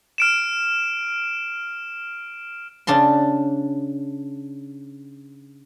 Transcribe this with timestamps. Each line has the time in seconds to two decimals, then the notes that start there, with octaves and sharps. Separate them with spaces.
0.18 F6 D7 E7
2.87 C#3 D4 A5 C6